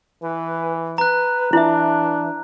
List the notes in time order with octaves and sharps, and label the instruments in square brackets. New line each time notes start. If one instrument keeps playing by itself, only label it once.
[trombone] E3 [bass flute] B4
[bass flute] B4 [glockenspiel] A#5 F#6
[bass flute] E3 [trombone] D4 [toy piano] E4 E5